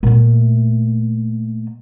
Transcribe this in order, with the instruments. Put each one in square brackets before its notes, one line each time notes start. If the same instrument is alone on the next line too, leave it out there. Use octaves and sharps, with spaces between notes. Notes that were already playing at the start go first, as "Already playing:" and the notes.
[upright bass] A#2 A3